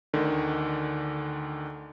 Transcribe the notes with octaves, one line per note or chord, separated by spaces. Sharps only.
D2 D3 D#3